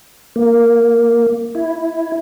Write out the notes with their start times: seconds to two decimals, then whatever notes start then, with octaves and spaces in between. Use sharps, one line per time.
0.36 A#3
1.55 E4